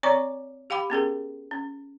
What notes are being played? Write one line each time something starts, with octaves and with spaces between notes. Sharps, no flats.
C4 C#5 D5 A#5 C#6 D6
G4 F5 G5 B5 D6
B3 C#4 G#4 A#4
C#4